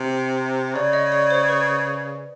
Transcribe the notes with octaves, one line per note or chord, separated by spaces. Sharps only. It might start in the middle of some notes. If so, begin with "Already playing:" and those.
Already playing: C3
C#3 D5
D#5
D5
C5
B4